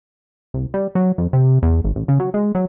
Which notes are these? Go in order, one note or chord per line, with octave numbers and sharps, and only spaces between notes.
C2
G3
F#3
F2
C3
E2
G#1
A1
C#3
F#3
G#3
F#3